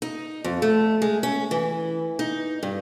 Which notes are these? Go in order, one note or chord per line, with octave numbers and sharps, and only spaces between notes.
D#4
F2
A3
G#3
C#4
E3
D#4
G2